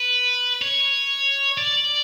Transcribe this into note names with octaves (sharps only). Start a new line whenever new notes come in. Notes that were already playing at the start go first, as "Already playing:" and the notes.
Already playing: B4
C#5
D5